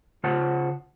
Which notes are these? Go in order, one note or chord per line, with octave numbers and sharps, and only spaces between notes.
C#3 F4 C5 F#5 A5